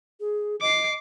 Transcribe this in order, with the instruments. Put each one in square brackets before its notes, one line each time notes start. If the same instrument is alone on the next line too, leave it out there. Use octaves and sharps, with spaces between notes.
[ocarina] G#4
[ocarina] D#5 [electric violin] D6 C7